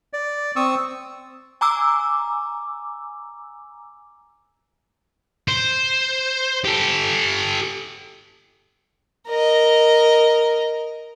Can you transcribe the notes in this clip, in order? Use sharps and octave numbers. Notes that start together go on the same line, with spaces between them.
D5
C4 C#6 D#6 E6
G#5 A#5 D6 E6
C5
G4 A4
A#4 D#5